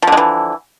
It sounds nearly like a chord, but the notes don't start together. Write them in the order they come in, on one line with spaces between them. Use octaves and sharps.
F3 D3 G#3 E3